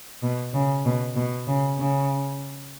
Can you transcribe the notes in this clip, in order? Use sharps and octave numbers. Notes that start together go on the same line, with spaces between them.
B2
C#3
B2
B2
C#3
C#3